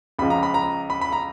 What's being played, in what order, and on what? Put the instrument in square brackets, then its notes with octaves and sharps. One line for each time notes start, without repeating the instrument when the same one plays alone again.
[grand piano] C#2 C#3 F3 B5
A#5
B5
A#5
B5
B5
A#5